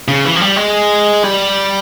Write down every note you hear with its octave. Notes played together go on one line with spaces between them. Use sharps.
C#3
E3
F3
G3
G#3
G3